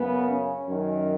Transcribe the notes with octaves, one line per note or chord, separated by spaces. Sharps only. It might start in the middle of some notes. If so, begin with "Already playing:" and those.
Already playing: F#2 C#3 B3
C#4
F#2 D#3